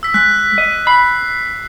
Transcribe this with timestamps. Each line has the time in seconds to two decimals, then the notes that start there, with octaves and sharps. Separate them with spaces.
0.03 E6 B6
0.14 G#3 F#6 B6
0.58 D#5
0.87 B5 C7